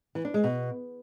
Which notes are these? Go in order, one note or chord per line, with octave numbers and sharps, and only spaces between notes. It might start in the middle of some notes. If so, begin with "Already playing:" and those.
E3
D4
G#3
B2